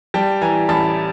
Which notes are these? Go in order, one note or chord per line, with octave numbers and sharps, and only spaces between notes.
G3 G5 A5
E3 G#5 A#5
A1 A5 B5